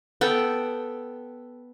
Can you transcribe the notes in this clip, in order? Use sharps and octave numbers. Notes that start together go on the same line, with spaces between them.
B3 A4 G5